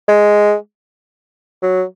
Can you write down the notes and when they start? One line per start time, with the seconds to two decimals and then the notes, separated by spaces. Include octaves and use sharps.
0.08 G#3
1.62 F#3